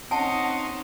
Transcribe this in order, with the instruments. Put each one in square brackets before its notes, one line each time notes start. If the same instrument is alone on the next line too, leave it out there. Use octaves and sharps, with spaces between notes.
[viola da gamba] C4 C#4 D#4 [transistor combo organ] D#5 C6 [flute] F#5 [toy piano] G#5 A5